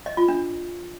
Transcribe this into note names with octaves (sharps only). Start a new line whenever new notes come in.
D#5
F4
D4